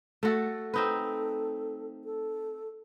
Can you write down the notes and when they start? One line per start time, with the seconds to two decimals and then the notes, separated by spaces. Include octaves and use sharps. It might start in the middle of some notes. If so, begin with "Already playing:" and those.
0.23 A3 F#4 A4
0.74 C4 D#4 A4 B4
2.05 A4